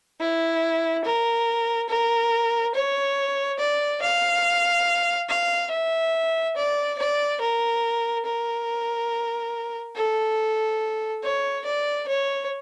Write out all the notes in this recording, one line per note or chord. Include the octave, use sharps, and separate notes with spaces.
E4
A#4
A#4
C#5
D5
F5
F5
E5
D5
D5
A#4
A#4
A4
C#5
D5
C#5